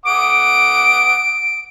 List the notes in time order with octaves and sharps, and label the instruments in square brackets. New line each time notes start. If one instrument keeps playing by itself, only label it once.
[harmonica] F#5 D6 D#6 [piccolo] D7